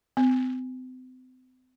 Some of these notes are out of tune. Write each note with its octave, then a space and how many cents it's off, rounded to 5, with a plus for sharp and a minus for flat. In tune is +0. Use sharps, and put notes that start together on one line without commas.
C4 -40